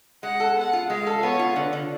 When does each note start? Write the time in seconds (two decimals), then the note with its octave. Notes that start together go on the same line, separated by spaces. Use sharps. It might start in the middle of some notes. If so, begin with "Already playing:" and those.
0.23 G#3 F#5
0.40 A4
0.57 B3 F#5
0.73 F4
0.90 G#3 F5
1.07 A4
1.22 B3 C#5
1.39 F4
1.56 D3
1.73 D3